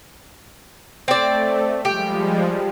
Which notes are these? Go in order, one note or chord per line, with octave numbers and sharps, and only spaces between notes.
A3 C4 D5
F3 G3 G#3 G4